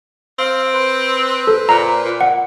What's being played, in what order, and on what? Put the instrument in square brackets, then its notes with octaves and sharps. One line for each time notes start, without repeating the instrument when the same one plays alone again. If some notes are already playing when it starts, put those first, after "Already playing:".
[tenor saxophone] C4 [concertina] F5
[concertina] B4 C5
[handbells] A4
[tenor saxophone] A#2 [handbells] A#5
[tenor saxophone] A#2
[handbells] F#5